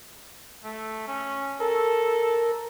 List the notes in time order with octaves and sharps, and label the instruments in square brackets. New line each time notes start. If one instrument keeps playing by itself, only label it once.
[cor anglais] A3
C#4
[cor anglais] A4 [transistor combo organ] A#4